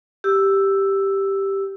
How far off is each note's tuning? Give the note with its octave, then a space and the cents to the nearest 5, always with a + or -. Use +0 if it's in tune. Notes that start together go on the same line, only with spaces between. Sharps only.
G4 +0 E6 +0